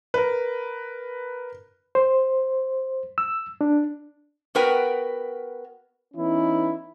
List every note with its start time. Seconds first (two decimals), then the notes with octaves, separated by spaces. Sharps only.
0.14 A#4 B4
1.95 C5
3.18 E6
3.61 D4
4.55 B3 F#4 A#4 B4 G5
6.15 E3 B3 C#4 D#4 E4